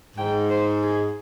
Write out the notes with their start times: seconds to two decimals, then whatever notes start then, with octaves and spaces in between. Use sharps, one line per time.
0.17 G#2 G5
0.50 C5
0.83 G#4